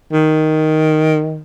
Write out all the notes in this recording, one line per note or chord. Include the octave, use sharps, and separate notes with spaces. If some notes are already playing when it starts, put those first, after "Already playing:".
D#3